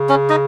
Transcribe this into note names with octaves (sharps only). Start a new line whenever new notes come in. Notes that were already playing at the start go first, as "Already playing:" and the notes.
Already playing: C#3
C#4
D#4